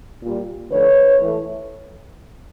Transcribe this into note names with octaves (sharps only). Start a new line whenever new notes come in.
A#2 G3
D3 F3 A3 B4 C#5
A2 E3 A3